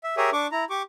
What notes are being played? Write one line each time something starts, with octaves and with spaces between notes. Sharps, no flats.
E5
G4 G#4 A#4 C#5 E5 D#6
D4 C#6 D6
E4 A#5
G4 C#6 D6